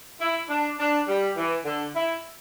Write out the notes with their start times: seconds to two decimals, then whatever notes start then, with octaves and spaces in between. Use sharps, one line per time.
0.20 E4
0.49 D4
0.79 D4
1.07 G3
1.37 E3
1.65 D3
1.96 E4